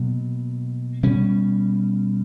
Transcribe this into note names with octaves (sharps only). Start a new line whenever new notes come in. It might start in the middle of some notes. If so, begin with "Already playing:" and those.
Already playing: B2 F#3 A#3
B2 G3 C#4